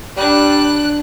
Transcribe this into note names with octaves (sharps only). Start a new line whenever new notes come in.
G3 D4 F#6